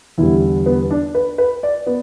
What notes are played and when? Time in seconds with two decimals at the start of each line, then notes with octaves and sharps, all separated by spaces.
0.18 E2 D3 G3 E4
0.66 B3
0.91 D4
1.15 B4
1.38 B4
1.63 D5
1.86 B3